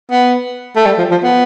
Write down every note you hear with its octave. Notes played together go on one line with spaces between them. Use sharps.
B3
A3
G3
F3
F3
B3